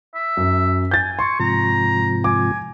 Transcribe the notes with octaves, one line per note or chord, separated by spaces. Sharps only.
E5
F#2
G#5 G6 A6
C6 C#6
G#2 C3 F3 A#5
G#5 D6